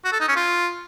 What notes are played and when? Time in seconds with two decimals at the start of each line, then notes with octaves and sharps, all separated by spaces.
0.04 F#4
0.12 A4
0.20 D#4
0.28 C#4
0.36 F4